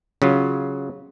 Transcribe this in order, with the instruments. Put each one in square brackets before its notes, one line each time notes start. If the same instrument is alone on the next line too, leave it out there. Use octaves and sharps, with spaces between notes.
[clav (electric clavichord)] C#3 F#3 F4